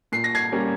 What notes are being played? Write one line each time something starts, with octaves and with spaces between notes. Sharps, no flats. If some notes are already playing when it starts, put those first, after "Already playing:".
A#2 C7
A#6
G#6 C7
G3 A#3 C#4